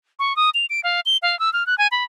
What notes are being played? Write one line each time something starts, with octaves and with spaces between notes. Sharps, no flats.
C#6
D#6
F7
D7
F5
G7
F5
E6
F6
F#6
G#5
B5